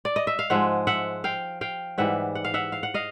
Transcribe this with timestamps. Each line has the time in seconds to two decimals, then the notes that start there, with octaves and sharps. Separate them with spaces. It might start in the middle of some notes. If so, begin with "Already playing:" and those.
0.05 D5
0.16 D#5
0.27 E5
0.39 F5
0.50 G#2 F3 G#3 E5 F#5
0.87 E5 F#5
1.24 F5 G5
1.61 F5 G5
1.98 G#2 E3 G3 E5 F#5
2.35 F#5
2.45 F5
2.54 E5 F#5
2.72 F5
2.83 F#5
2.94 D#5 F5